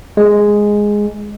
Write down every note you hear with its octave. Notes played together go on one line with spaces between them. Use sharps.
G#3